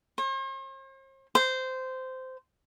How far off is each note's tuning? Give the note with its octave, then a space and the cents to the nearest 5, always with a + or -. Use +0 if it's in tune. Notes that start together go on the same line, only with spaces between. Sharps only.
C5 +45
C5 -15